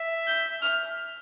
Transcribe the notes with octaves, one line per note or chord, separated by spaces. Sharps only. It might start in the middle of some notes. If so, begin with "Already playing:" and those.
Already playing: E5
G6
F6